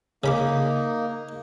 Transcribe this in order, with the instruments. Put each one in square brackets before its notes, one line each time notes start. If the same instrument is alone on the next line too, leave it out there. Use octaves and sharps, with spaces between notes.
[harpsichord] C#3 B5 D6 [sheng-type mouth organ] A#3 D#4